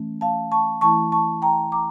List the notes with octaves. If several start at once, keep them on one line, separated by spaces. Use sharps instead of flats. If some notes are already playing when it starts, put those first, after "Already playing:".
Already playing: E3 A3 C#4
F5 A5
A5 C#6
E3 A3 E4 A5 C#6
A5 C#6
G5 A#5
A#5 D6